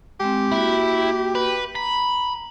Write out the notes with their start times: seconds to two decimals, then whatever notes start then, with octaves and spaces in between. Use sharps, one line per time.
0.20 G#3 C4 G4
0.52 A#3 E4 F#4
1.35 B4
1.75 A#5 B5